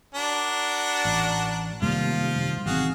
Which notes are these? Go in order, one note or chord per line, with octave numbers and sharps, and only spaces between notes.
D4 F#4 A#4
A1
F#2 C3 D#3 F3 G3 A3 A#3 F4
A1 D#3 C4 F#4 G#4 F5